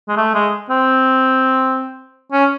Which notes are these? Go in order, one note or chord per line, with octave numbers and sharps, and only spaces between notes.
G#3
A3
G#3
C4
C#4